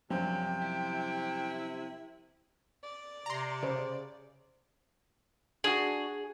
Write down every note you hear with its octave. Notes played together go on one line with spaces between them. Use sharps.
F#2 C3 F3 G3 C#4 G5
E4
D5
C3 A#5 C6
C#3 C5
D4 F#4 G#4